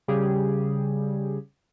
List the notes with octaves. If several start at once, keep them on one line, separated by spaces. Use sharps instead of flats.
C#3 G3 G4 G#4